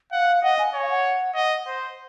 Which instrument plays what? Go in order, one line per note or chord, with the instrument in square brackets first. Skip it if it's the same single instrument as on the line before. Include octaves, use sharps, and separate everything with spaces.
[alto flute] F5 [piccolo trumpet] F#5
[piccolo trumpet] D#5 [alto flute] F#5
[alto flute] G#5
[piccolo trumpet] C#5 [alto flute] G#5
[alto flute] F5
F#5
[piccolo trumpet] D#5 [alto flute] F#5
[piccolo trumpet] C5